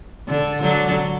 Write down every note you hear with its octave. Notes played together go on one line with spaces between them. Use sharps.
D3
D3 F#3